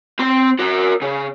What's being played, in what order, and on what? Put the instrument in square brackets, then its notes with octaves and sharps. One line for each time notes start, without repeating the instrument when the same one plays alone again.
[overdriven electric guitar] C4 C6
F#4 A#4
C#3